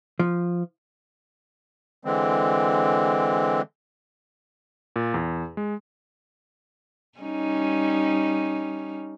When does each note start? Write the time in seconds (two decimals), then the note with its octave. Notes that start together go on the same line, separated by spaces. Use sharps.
0.19 F3
2.05 D3 E3 G#3 C4
4.96 A#2
5.14 E2
5.57 G#3
7.19 G3 C#4 D#4